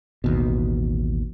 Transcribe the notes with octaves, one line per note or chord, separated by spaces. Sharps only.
A1 D#2 B2